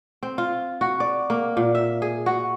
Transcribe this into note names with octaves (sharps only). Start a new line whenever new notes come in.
C4
F4
F#4
D5
A#3
A#2
E5
G#4
F#4